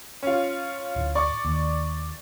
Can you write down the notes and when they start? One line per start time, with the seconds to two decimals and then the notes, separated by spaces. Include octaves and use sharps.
0.23 C#4 F4
0.96 D1
1.15 D5 C#6
1.45 D#2